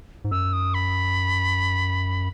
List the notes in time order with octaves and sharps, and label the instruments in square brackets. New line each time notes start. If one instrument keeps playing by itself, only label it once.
[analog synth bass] G#2
[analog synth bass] F#2 [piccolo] E6
[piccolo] D#6
B5